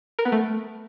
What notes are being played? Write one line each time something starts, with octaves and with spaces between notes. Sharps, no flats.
A#4
B3
A3